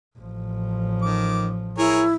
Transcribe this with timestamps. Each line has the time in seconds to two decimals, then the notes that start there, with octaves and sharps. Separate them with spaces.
0.19 A1 F3
1.02 D#3 D6
1.78 E4 G#4 A#4 C#5